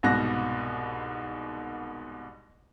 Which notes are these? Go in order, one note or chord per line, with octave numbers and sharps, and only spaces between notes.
C2 G#2 B2 F#6 A#6